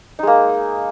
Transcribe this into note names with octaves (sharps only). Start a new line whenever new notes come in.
G#3 A#3 D#4